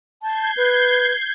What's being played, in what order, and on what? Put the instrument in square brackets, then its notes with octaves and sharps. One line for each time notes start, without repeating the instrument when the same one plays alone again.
[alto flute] A5 [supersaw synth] G6 G#6 C7
[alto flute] B4